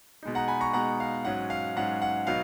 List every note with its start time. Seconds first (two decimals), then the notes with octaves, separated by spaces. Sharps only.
0.23 B2 G#3 D#4
0.35 F#5 A#5
0.48 G#5 B5
0.61 A#5 C#6
0.73 B2 G#3 D#4 F#5 A#5
1.00 F5
1.25 G#2 F#3 C#4 F#5
1.50 F5
1.76 G#2 F#3 C#4 F#5
2.02 F#5
2.27 B2 F#3 B3 D#4 F5